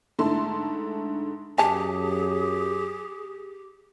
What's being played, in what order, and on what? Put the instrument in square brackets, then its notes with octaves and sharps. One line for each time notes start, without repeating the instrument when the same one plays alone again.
[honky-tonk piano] G#2 D3 A3 E4 A5 C6
[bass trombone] F#2 [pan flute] G4 [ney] G#4 [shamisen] G#5 A5